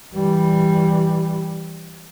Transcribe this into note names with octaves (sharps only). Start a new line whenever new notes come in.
E3 G3